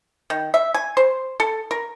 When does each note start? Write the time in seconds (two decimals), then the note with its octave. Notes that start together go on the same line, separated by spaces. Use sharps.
0.30 D#3
0.54 E5
0.74 G#5
0.97 C5
1.40 A4
1.71 A#4